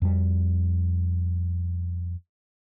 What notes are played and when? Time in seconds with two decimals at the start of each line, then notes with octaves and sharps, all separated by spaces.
0.02 F2 G3